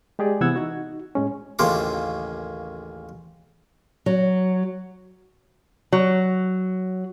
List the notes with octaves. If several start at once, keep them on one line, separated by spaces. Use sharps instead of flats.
G#3 G4 G#4 D5
C3 E3 B3 F#5 E6 G#6
D#4 F#4
A2 G#3 C#4
A1 D#2 C#3 A#3 F4 D6
F#3
F#3